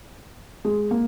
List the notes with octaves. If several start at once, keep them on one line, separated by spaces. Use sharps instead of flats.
G#3
A#3